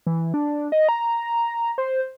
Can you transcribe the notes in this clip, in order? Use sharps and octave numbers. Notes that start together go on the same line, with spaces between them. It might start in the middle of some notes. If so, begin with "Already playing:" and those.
E3
D4
D#5
A#5
C5